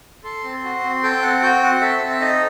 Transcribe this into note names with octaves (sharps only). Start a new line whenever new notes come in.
A4 C6
C4
F#4
C4
A4 G5
C4 F#5
F#4 G5
C4 F#5
A4 E5
C4
E5
D#4 D#5